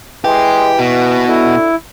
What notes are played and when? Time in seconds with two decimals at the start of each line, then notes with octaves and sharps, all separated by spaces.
0.24 E3 G#3 G4
0.79 B2 F#4
1.28 D3 E4